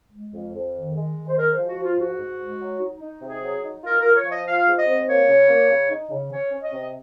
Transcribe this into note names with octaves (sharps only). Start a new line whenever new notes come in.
G#3
F2
F2
D#3
G#3
D#3
C5
G#3 A#4
F3 C5
F#4
F3
F4
G#2 F#4
G#2
G#3
F#3
D#4
D#4
C3 G#4
F#3
D#4
F4 A#4
A#4
F4
C#5
F3 D#5
F4 F5
G#2
D#5
C4
A#3 C#5
C#3
A#3
C#3
D#4
C#3
C#4 C#5
C#4
D#5
C3